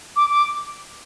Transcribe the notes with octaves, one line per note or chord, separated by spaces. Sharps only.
D6
D6